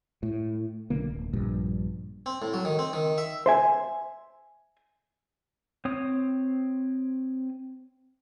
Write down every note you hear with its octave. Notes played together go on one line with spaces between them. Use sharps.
A2
B1 D3 A#3
D1
A#1 G2
C4
A2
F#3
D#3
C4
D#3
E5
C5 E5 G#5
C4 C#5 D#6